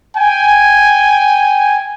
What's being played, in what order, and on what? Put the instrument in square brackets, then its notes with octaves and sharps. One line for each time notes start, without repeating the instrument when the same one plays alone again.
[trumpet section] G5 G#5